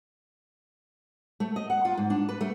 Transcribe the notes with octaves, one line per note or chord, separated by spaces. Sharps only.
A3
D#5
F#5
F4
G#2
D4
B4
A3